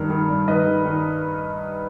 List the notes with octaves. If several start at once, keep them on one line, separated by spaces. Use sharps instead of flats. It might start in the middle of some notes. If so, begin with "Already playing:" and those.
Already playing: G2 D#3 A#4
D#3
G2
D#3 B4 D#5
D#3
D#3